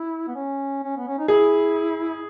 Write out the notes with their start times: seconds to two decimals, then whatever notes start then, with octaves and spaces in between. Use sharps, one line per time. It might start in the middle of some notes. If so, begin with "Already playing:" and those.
Already playing: E4
0.28 B3
0.35 C#4
0.83 C#4
0.97 B3
1.08 C#4
1.18 D#4
1.28 E4 G#4